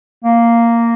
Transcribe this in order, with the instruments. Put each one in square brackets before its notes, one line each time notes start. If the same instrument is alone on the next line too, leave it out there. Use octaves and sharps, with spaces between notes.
[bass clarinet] A#3